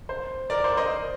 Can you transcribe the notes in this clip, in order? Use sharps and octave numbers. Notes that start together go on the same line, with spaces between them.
C5
A#4 D5
C5
C5 D#5